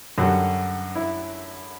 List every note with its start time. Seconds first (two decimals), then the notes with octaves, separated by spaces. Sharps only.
0.18 F#2 D3 G3 F#4
0.95 E4